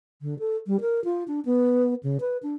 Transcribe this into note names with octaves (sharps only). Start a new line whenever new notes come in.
D3
A4
G3
A#4
F4
D4
B3
C#3
B4
D4